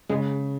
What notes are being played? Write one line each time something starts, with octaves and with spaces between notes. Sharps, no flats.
C#3 G#3